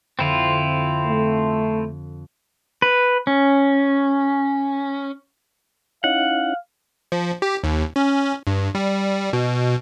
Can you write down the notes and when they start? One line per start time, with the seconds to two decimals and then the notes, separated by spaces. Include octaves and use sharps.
0.19 F2 D3 C4 E4 F4
1.06 A3
2.82 B4
3.27 C#4
6.04 C#4 D#4 E4 F5 F#5
7.12 F3
7.42 G4
7.64 D#2
7.96 C#4
8.47 G2
8.75 G3
9.33 B2